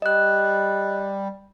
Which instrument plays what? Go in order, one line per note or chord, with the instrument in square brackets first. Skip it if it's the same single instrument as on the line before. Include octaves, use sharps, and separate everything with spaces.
[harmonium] G3 [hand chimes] D#5 F#6